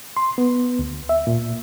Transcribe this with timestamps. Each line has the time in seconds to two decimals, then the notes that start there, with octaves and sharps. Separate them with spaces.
0.17 C6
0.38 B3
0.79 D2
1.09 E5
1.27 A#2